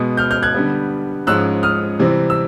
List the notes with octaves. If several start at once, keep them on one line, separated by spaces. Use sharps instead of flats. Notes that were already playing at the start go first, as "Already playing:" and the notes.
Already playing: B2 G#3 B3
F6 G6
F6 G6
F#6 G#6
D3 G3 B3
G#2 F3 G#3 C#4 E6 F#6
D#6 F6
C3 E3 G3 C4
E6